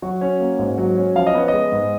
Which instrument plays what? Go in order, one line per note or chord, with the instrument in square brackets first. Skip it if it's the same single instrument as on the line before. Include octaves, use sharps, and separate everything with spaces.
[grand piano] F#3 F#4
C#4
A#3
G#2
F#3
C#4
F3 F5
D#5
B3 C#5
D#5
G#3
G#2